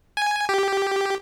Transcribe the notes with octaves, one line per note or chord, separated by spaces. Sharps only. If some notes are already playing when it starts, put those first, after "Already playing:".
G#5
G4